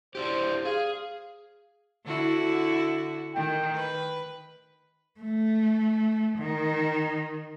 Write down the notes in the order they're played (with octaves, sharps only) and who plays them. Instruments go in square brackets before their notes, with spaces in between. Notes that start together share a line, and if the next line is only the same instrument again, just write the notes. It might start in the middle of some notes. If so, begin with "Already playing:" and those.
[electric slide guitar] D4 E4 G4 [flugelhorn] C5
[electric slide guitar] G#4 [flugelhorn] F5
[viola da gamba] D3 E4 F#4
[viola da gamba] D#3 [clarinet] G5
[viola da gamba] B4
[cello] A3
D#3